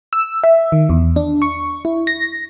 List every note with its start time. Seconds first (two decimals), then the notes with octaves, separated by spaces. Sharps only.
0.13 E6
0.44 E5
0.72 D#3
0.89 E2
1.16 D4
1.42 C#6
1.85 E4
2.07 A#6